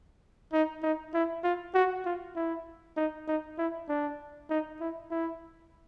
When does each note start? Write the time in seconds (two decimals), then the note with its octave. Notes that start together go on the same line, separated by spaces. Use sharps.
0.53 D#4
0.83 D#4
1.14 E4
1.44 F4
1.74 F#4
2.05 F4
2.36 E4
2.97 D#4
3.27 D#4
3.58 E4
3.88 D4
4.50 D#4
4.80 E4
5.11 E4